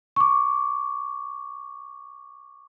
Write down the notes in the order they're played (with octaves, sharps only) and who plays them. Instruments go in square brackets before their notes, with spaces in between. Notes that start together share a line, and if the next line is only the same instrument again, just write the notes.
[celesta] C#6 D6